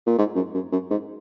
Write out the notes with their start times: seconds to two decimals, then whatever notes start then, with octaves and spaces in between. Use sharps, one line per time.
0.07 A#2
0.18 G#2
0.36 F#2
0.55 F#2
0.72 F#2
0.91 G#2